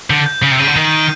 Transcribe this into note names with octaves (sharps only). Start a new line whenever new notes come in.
D3 G6
G6
C#3 C7
C3
C#3 D#7
D3
D#3 G6
D#7